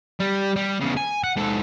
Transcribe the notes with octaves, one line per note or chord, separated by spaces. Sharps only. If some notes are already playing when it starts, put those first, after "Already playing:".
G3
G3
E2 C#3
G#5
F#5
G#2 A4